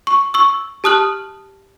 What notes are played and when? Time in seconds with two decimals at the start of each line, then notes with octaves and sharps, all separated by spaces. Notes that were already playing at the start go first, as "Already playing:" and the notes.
0.07 C#6
0.34 C#6 E6
0.84 G4 A5 D#6 F6 F#6 F#7